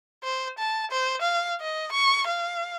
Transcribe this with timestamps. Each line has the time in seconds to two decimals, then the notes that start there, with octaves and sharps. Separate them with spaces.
0.24 C5
0.58 A5
0.91 C5
1.21 F5
1.61 D#5
1.92 C#6
2.28 F5